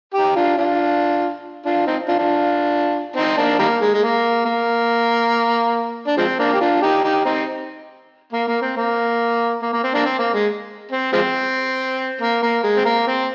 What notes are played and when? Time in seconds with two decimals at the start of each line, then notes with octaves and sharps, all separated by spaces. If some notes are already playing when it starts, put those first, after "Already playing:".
0.14 D#4 G4
0.36 D4 F4
0.57 D4 F4
1.65 D4 F4
1.86 C4 D#4
2.08 D4 F4
2.19 D4 F4
3.16 C4 D#4
3.37 A#3 D4
3.59 D#3 G3 A#3
3.81 G#3
3.94 G#3
4.02 A#3
4.45 A#3
6.07 D4
6.17 F3 G#3 C4
6.39 A#3 D4
6.53 G4
6.60 D4 F4
6.82 D#4 G4
7.04 D#4 G4
7.25 C4 D#4
8.33 A#3
8.48 A#3
8.61 C4
8.76 A#3
9.62 A#3
9.73 A#3
9.84 C4
9.94 A#3 D4
10.05 C4
10.19 A#3
10.34 G#3
10.91 C4
11.13 F3 G#3 C4
12.21 A#3
12.42 A#3
12.63 G#3
12.77 C4
12.85 A#3
13.07 C4